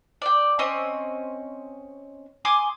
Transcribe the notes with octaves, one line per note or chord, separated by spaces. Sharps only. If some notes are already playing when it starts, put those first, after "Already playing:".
D5 G5
C4 C#4 C#5 D#5
G#5 C6 D6 D#6